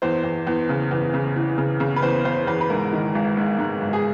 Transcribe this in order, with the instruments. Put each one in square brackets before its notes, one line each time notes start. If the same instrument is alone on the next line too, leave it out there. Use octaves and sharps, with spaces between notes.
[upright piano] E2 C5
E2
E2
C#3
E2
C#3
E3
C#3
C#3
B4
E2 C5
E2 C5
E2 B4
B4
G#2 A#4
D#3
G#1
G#2
G#2
G#1
G#4